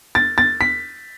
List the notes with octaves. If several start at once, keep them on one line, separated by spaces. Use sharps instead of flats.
A6
A6
B6